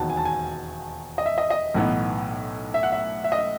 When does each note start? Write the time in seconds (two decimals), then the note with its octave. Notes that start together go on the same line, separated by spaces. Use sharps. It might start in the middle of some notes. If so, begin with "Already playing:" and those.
Already playing: E1 D#2 D#3 F#3 B3 A5
0.10 G#5
0.17 A5
0.25 G#5
1.18 D#5
1.26 E5
1.38 D#5
1.50 D#5
1.74 B1 A2 E3 B3 D#4
2.74 E5
2.83 F#5
2.92 E5
3.24 E5
3.32 D#5
3.39 E5